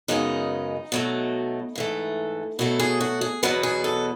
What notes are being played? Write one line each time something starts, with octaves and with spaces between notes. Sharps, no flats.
F#2 C#3 G#3 B3 D#4
B2 F#3 A3
G#2 E3 A3
B2 F#3 A3 E4
G#4
F#4
G#4
E2 B2 F#3 B3 B4
G#4
A4